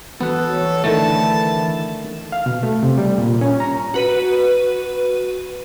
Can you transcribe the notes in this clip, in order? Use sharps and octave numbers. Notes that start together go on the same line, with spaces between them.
E3 B3 F#4 A4 B4
C#5
D3 D#3 A3 E4 A5
F5
B2
A3
C3
G3
A#2
C#4
A#5
F#4 B4 D#7